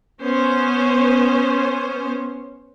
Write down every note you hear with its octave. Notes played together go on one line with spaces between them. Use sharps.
B3 C#4 C5